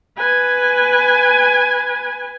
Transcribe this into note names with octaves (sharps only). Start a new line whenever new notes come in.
B4 G#5